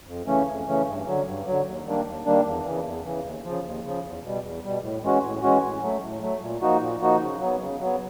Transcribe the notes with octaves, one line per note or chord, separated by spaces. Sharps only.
F2
C#3 E3 A3 C#4
F2
C#3 E3 A3 C#4
G2
D3 F#3
G2
D3 F#3
D#2
D#3 G3 A#3 D4
D#2
D#3 G3 A#3 D4
E2
C#3 E3
E2
C#3 E3
D#2
C#3 F3
D#2
C#3 F3
E2
B2 G3
E2
B2 G3
A2
E3 G#3 C#4 F#4
A2
E3 G#3 C#4 F#4
A2
F#3 A3
A2
F#3 A3
A#2
F3 A#3 D#4 F#4
A#2
F3 A#3 D#4 F#4
C#3
F#3 B3
C#3
F#3 B3